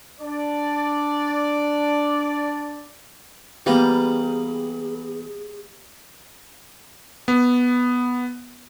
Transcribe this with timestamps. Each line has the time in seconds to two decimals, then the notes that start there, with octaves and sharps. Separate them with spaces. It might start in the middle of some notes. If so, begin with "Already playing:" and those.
0.20 D4 D5
3.66 E3 G3 A#3 B3 G#4 A#5
7.28 B3